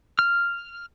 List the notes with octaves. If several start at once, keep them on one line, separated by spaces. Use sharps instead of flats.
F6